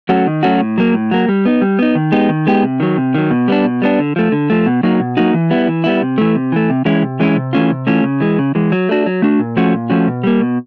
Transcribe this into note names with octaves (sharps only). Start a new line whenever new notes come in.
F#3 A3 C#4 F#4
D#3
F#3 A3 C#4 F#4
A2
F#3 A#3
A2
F#3 A#3
G3
B3 D#4
G3
B3 D#4
D#3
G#3 B3 D#4 G4
D#3
G#3 B3 D#4 G4
C3
D#3 F#3
C3
D#3 F#3
B2
G3 B3 D4
B2
G3 B3 D4
D3
F3 A3
D3
F3 A3
B2
F#3 A#3 D#4 F#4
B2
F#3 A#3 D#4 F#4
E3
G3 B3 E4
E3
G3 B3 E4
C3
E3 A3
C3
E3 A3
C3
E3 G#3 C#4 E4
C3
E3 G#3 C#4 E4
C3
E3 A3 C#4 F4
C3
E3 A3 C#4 F4
C#3
E3 G#3
C#3
E3 G#3
F#3
A3 D4 F#4
F#3
A3 D4 F#4
A#2
F3 A3 C#4 F#4
A#2
F3 A3 C#4 F#4
B2
G3 A#3
B2